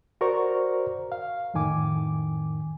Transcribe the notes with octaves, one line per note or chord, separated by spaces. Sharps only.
F#4 A#4 C5 D5 A#5 C#6
F5
F2 A2 D#3 G#5 D6